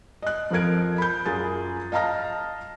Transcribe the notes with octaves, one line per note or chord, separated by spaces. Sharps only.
D#5 F#6
F2 F3 A4 A#4 G#6 D7
B5 G6
F#2 F4 G#4 A6
D#5 F5 A5 A#5 F6 A#6